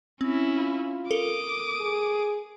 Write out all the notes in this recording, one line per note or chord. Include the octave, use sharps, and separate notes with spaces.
C4 C#4 E4
F4
A4 A#4 D6 D#6
G#4